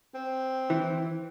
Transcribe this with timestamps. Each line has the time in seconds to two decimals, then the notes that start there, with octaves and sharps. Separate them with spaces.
0.14 C4
0.70 E3